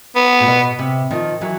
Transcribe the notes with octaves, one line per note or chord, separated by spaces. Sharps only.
B3
A#2
B2
C3
D#3 F3
E3 F#3